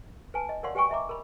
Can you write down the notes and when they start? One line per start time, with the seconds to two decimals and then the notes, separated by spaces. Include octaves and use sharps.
0.34 B4 G#5 A5
0.49 D#5
0.63 A#4 C#5 D5 F5 F#5 C6
0.75 G4 B4 G5 G#5 C#6
0.89 D#5 E5 A#5 D6
1.09 A#4 B5